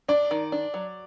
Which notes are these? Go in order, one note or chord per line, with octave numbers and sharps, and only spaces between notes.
D4 D5
D#3
D4
F#3